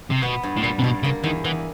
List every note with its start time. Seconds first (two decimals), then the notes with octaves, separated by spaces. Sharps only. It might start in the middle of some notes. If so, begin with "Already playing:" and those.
0.11 C3
0.23 B2 B3
0.43 G2
0.57 A2
0.63 A#2 G3
0.79 C3
0.84 G2 B2
1.03 C#3 A#3
1.24 E2 D#3
1.45 E2 E3